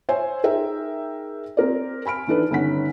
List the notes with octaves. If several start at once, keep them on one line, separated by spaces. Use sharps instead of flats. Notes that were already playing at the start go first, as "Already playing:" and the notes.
C5 C#5 E5 G#5
D#4 G#4 A#4 E5 G5
C4 A#4 D5
G#5 B5 F6 D7
D#3 E3 D4 A4 B4
G1 D#3 C#4 F#5 B6